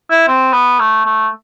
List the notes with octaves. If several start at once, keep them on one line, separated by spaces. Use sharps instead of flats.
E4
C4
B3
A3
A3